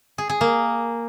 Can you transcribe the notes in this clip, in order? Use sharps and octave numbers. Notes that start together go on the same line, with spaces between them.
G#4
G#4
A#3